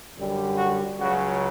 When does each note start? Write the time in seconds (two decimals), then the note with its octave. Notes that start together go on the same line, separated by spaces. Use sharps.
0.17 F#2 D3 G3
0.57 F#4
0.99 C#2 C#3 F#3 F#4